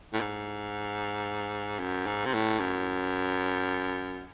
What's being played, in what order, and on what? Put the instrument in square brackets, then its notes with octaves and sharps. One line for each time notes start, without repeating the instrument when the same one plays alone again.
[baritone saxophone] A2
G#2
F#2
G#2
C3
A2
F#2